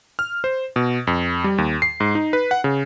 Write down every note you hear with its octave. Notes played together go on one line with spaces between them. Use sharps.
F6
C5
B2
F2
G3
D#2
C7
G#2
D#4
B4
F#5
C#3